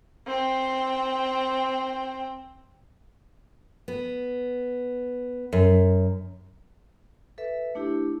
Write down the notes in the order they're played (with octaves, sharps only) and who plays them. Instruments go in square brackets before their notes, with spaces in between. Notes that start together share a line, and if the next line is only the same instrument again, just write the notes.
[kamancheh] C4 G5
[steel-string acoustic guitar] B3
F#2
[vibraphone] A4 B4 E5
A3 D4 E4 G4